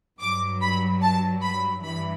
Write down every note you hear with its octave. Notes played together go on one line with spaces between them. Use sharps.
G2 F#3 D6
B5
A5
B5
G2 E3 B5